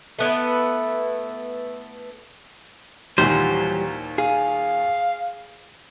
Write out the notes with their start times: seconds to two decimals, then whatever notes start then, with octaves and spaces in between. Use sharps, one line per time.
0.18 A3 B3 E4
3.18 D#2 A#2 E3 F#3 G3 C5
4.18 G#4 F5